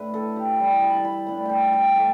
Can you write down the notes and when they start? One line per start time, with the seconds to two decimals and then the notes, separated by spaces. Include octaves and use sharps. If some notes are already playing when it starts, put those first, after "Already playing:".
Already playing: A2 D4 B4
0.14 A4
0.36 G4
0.60 E3 G3 E4
0.82 A5
0.90 B5
0.96 A5
1.05 B5
1.27 A2 G3 B3 D4 B5
1.45 G5 A5
1.73 G5
1.95 E3 A3 A5